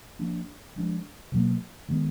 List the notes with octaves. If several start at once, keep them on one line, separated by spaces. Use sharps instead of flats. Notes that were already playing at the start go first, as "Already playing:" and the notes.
F3 A#3 D4
F3 G#3 D4
B2 F#3 A#3
D#3 G#3 B3